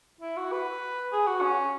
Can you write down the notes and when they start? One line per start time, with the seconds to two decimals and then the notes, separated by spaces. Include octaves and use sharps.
0.21 E4
0.37 F#4
0.52 B4
1.12 G#4
1.27 F#4
1.42 C#4